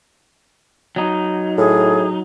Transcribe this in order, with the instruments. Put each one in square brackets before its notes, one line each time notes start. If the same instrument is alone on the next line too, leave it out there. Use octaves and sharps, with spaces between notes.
[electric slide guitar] F#3 D#4
[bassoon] A2 [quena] G#4